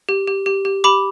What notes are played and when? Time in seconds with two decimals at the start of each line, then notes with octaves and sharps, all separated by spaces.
0.09 G4
0.27 G4
0.46 G4
0.65 G4
0.84 G4 B5 D6